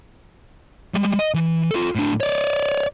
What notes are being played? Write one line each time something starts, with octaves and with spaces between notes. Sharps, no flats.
G3 G#3
D#5
E3
F4 A4
A2 D4
C#5 D5